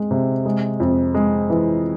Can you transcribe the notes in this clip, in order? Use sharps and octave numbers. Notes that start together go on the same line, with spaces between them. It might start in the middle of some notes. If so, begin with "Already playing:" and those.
Already playing: G#3 C4
C3
G#3
F2
G#3
E3